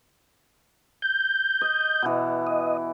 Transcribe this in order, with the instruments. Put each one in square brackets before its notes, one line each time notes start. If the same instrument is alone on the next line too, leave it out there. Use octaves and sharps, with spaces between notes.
[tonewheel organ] G6
[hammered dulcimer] D#5
B2 E3
[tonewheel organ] D#5